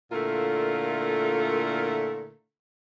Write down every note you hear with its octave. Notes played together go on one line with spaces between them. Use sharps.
A#2 D3 A3 E4 F4 A#4